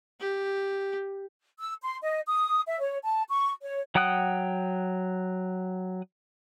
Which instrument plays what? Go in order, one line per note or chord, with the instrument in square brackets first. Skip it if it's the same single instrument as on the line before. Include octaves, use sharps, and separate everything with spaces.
[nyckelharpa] G4
[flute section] E6
C6
D#5
D#6
E5
C#5
A5
C#6
C#5
[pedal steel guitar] F#3 F#5 G5 D#6 F#6